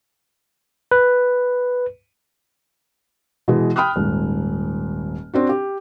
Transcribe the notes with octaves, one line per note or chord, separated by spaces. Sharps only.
B4
B2 E3 G#3
G5 B5 D#6 F6 F#6
D#1 G#2
C4 D4 F#4
G4